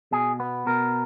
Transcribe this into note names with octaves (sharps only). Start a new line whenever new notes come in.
B2 G#4
B3
B2 A#4